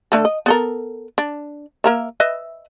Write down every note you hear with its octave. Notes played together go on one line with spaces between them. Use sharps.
D3 A3 A4
D#5
B3 A4 A#4
D4
A#3 A#4 E5
B4 D#5 E5